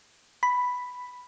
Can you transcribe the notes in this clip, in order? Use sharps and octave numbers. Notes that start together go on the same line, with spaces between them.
B5